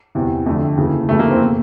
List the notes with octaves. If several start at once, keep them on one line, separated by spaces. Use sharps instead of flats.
E2 C3 E3
F2 D3 A3
D#2 C#3 E3
F2 C#3 E3 A3
A#3
C4
B2